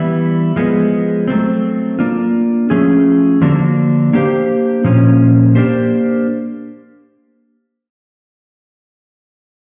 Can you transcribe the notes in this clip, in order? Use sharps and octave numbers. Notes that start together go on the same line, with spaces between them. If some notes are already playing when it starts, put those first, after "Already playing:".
Already playing: E3 G3 B3 E4
F3 G#3 B3
F#3 A3 C4
A#3 D4 F4
F3 A3 C#4 F4 G#4
D3 F3 A#3 D4 F#4
A#3 D4 G4 C5 F5
A#2 F3 A#3 C#4
A#3 D4 G4 C5